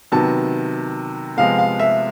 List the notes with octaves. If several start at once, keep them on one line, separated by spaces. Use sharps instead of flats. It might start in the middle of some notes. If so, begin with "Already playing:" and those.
C3 D#3 F#3 B3 A5
C3 F3 G#3 B3 F5
F5
E5